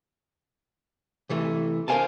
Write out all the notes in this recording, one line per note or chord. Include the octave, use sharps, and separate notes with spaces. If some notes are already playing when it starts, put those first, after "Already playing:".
C3 E3 A3
A#4 C5 C#5 F5 G#5 A5